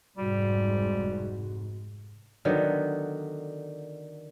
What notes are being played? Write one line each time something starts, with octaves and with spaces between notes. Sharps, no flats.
F1 G#2 G3 F#4
D3 D#3 F#3 B3